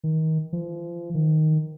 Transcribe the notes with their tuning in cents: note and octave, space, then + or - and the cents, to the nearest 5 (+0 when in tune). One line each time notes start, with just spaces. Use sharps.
D#3 +30
F3 -30
D#3 +0